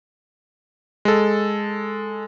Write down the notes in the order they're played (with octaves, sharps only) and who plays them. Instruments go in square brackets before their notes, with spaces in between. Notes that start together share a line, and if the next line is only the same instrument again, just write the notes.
[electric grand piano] G#3 A4